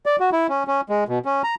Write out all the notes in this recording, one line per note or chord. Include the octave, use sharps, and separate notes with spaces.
D5
F#4
E4
C#4
C#4
G#3
B2
C#4
A#5